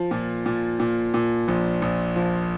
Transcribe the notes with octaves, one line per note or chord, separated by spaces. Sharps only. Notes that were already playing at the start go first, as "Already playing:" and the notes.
Already playing: F3
A#2
A#2
A#2
A#2
A#1
A#1
F3